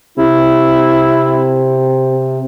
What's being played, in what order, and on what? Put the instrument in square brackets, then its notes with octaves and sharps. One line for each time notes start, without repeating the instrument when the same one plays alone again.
[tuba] C3 [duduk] E4